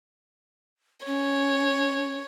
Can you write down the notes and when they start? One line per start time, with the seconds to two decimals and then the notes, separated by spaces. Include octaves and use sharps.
1.06 C#4 C#5